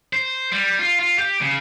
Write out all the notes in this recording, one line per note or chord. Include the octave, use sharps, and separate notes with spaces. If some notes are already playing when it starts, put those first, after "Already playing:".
C5
G3
F4
F4
G4
C#3